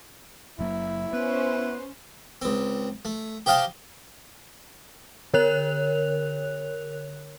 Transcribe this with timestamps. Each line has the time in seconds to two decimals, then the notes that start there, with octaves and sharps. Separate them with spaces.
0.59 F#1 F#3 A#3 E4
1.13 B3 C#4 B4 C5
2.42 C#2 C4
3.05 A3
3.46 G4 C5 D#5 F5 G5 A5
5.34 D3 A#4 C#5 F#6 F7